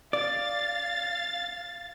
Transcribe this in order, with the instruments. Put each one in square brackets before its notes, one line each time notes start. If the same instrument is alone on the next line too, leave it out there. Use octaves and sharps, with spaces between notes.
[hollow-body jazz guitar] D5 [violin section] F5 A6